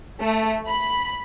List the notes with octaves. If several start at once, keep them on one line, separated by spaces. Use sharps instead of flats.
A3
B5